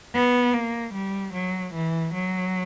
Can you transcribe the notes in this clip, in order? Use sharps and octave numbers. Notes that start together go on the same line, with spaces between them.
B3
A#3
G3
F#3
E3
F#3